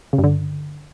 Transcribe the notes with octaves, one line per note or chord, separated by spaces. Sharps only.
C#3
G2
D3